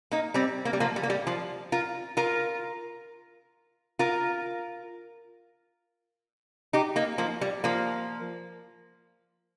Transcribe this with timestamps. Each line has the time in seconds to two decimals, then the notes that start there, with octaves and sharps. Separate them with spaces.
0.11 A#3 D#4
0.34 G3 C4
0.65 A#3
0.73 G3
0.80 F3 A#3
0.96 G3
1.03 A#3
1.10 G3
1.27 F3
1.72 F4 A#4
2.17 F4 A#4
3.99 F4 A#4
6.73 D#4 G4
6.96 A#3 D#4
7.18 F3 A#3
7.41 G3
7.64 F3 A#3